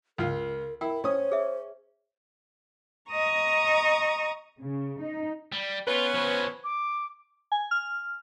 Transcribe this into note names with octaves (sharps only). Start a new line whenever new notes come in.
C#2 F4 A#4
E4 A#4 G5
C#4 C5 C#5 D#6
G#4 E5
D#5 A#5 C#6 D#6
C#3
D#4
G3
B3 C#4 F4 B4
F3 C#5
D6
G#5
F6